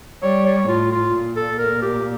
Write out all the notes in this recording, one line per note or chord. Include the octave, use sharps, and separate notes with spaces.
G3 C#5
C#5
A2 F4
F4
A#2
A4
A#4
G4